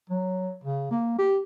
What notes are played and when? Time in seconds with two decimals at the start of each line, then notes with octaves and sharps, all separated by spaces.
0.09 F#3
0.64 C#3
0.91 A#3
1.18 G4